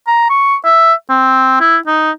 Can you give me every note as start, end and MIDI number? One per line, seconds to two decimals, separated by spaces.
0.07 0.29 82
0.30 0.55 85
0.65 0.93 76
1.10 1.59 60
1.60 1.77 64
1.87 2.11 63